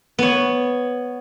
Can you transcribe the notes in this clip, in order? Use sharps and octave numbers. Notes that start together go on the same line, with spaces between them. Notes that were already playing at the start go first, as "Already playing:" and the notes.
B3 C#5